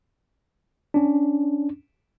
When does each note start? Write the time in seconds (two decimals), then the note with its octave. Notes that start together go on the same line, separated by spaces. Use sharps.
0.94 C#4 D4